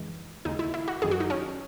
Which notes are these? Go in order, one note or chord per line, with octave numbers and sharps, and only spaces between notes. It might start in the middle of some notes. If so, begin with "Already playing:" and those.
Already playing: F#2 C#3 E3 G#3
D#2 C#3 G#3 D#4
E4
E4
F#4
G#1 F#2 D#3 F#3 G#4
F#4
D#4
C#4